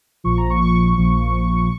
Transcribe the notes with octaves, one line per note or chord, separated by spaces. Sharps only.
A#1 A#2 F3 C#6
A#5
C#6
A#1 A#2 F3